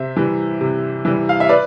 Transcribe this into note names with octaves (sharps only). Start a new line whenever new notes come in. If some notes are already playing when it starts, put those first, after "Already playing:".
Already playing: C3 C5 E5
E3 G3
C3
E3 G3
F5
E5
B4 D5